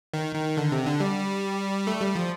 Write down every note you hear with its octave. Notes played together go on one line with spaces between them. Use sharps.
D#3
D#3
D3
C3
D3
G3
A3
G3
F3